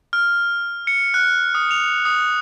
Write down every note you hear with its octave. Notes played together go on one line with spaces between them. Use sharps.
F6
C#7
F#6
D#6
F7
D#6